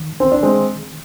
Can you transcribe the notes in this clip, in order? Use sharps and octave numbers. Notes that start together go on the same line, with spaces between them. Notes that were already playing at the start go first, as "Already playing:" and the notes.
Already playing: D#3
C4
D4
G#3 C4